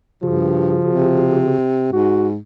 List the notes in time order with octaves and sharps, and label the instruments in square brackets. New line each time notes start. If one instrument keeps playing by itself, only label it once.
[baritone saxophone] G2 [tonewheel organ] C#3 F#4 G#4 [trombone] F3
[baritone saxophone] C3
[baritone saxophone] G#2 [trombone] F#4